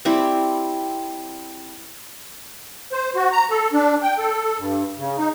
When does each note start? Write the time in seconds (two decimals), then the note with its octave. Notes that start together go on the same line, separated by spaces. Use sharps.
0.05 G3 C4 E4 G4
2.92 C5
3.16 F#4
3.32 A#5
3.50 A4
3.73 D4
4.03 G5
4.18 A4
4.59 G2
4.98 C#3
5.17 D#4